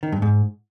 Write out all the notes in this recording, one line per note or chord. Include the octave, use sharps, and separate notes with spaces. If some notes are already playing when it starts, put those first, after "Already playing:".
D#3
G2
G#2